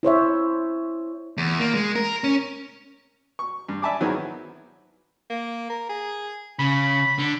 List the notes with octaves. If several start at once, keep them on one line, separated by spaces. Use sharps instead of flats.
E4 C5 C#5 E5
E2
A#3
G#3
A#4
C#4
C#6
G2
D5 E5 G#5 A5 B5 D6
D#3 F#3 B3 C4 E4 G#4
A#3
A#4
G#4
C#3 B5
D3